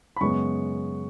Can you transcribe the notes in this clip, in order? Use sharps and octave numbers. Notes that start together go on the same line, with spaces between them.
B5
F#2 C#3 G#3 B3 C#6